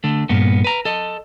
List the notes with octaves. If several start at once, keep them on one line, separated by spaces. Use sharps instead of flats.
D3 A3
G2 A#2 B3
B4 A#5
A4 D#5